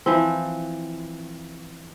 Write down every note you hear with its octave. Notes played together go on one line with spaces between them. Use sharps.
E3 F3 C4